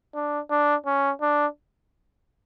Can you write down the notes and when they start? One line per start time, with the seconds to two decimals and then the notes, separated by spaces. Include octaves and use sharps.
0.15 D4
0.50 D4
0.86 C#4
1.22 D4